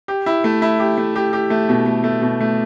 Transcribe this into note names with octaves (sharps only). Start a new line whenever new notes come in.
G4
E4
A3
E4
G4
A3
G4
G4
A3
B2
A3
A3
B2
A3